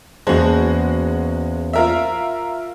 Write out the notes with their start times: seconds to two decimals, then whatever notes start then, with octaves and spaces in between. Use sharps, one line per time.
0.27 E2 G#3 A#3 C#4 F#4 C5 A5
1.73 F4 A#4 E5